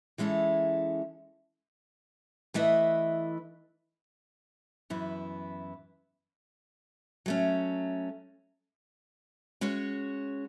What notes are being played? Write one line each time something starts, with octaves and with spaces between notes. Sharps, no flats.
E3 G#3 C#4 E4 A4
E3 A3 E4 B4 D#5
F#2 E3 B3 E4
F#3 A3 C#4
G#3 C#4 F#4 C#5